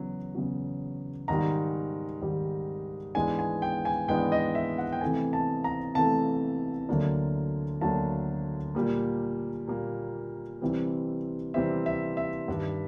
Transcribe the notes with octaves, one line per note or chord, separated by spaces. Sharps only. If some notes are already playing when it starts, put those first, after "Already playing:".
Already playing: E2 C#3 F#3
E2 C#3 F#3
G#2 D#3 G3 A#5
G#2 D#3 G3
G#2 E3 G#3 B3 D4 G#5
G#5
G5
G#5
G#2 E3 G#3 B3 D4 G5
D#5
E5
F#5
G5
C3 E3 A3 G#5
A5
A#5
C3 E3 A3 A5
D2 D3 F#3 A#3 D4
D2 D3 F#3 A#3 D4 A5
A#2 G3 A#3
A#2 G3 A#3
C3 E3 G3 C4
C3 E3 G3 C4 E5
E5
E5
G2 D#3 G3